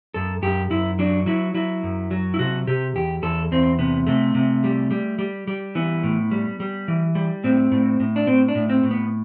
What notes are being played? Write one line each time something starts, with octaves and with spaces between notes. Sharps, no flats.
F#2 A4
F#2 G4
F#2 E4
F#3 D4
F#3 E4
F#3 E4
F#2
F#3
E4
C3 F#4
C3 G4
E2 G4
E2 A4
E2 C4
C3 B3
C3 A3
C3
G3
G3
G3
G3
E3 B3
A2
G3
G3
E3
G3
A2 C4
A2
A2
D4
A2 C4
D4
A2
C4
A2
B3